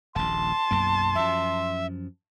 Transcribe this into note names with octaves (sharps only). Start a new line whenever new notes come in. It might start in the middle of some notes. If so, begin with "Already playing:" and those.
D#1 A#1 A5 C6
B1 F#2 A#3
F#2 F3 E5